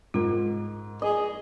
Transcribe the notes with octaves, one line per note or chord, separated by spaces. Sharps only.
G#2 F4 A#4
G#4 D#5